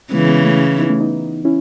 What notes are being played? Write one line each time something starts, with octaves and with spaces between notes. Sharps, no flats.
C#3 E3 G#3 B3
G#3 B3
A3 C#4
C#4 E4
B3 D#4
A3 C#4
B3 D#4
C#4 E4